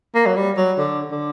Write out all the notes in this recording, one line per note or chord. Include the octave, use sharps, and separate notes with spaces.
A#3
F#3
G3
F#3
D3
D3